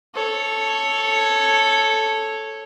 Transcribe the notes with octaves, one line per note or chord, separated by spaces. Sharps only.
A4 C#5